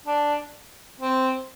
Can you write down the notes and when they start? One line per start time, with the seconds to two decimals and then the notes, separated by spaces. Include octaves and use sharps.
0.06 D4
1.00 C4